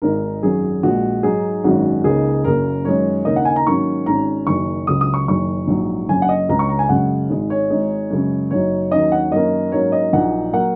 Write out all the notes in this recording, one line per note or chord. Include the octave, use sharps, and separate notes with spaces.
G#1 G#2 G#3 D#4 A#4
G#1 F#2 F#3 C#4 G#4
A#1 A#2 G#3 F#4
G#2 F#3 D#4 G#4
G#1 F#2 D#3 G#3 C#4 F#4
C#2 C#3 A#3 D#4 G#4
F#1 F#2 C#3 A#3 A#4
F#2 D#3 G#3 C#4 C#5
D#2 C#3 A#3 D#4 D#5
F#5
G#5
A#5
G#2 D#3 F#3 A#3 C#4 C#6
G#1 G#2 G#3 C#4 A#5
F#1 F#2 D#3 C#6
C#2 C#3 F#3 D#6
D#6
C#6
F#1 F#2 D#3 C#6
A#1 G#2 F#3
F#1 F#2 F#3 C#4 G#5
F#5
D#5
C#2 C#3 G#3 C#4 A#5
C#6
A#5
G#5
F#2 C#3 G#3 C#4 F#5
G#1 G#2 G#3
C#5
G#1 G#2 G#3 D#4
F#2 C#3 G#3 C#4
F#1 F#2 F#3 D#4 C#5
D#2 D#3 F#3 C#4 D#5
F#5
F#2 D#3 A#3 C#4 D#5
G#2 F#3 A#3 C#4 C#5
D#5
A#1 A#2 F#3 D#4 F#5
F#3 A#3 F#5